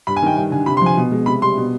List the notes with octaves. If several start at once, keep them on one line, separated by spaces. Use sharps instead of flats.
G2 B5
G#5
D#3 G5
G2 G5
D3 G#5
C3 B5
C6
F3 G#5
B2
G#3
C3 B5
G3 C6
B2